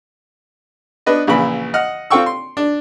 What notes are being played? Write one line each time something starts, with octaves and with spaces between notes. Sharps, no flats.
B3 D4 B4 D#5
A#1 C#3 E3 B5
D#5 F#5 F6
C4 F4 A4 G5 C#6 E6
C6
D4